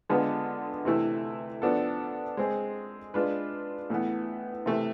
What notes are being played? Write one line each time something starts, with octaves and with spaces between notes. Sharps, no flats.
D3 G#3 B3 F4 B4
C3 E3 A3 E4
F3 B3 D4 A4
G#3 C4 G#4
G#3 D4 F4 B4
A2 E3 B3
C3 E3 A3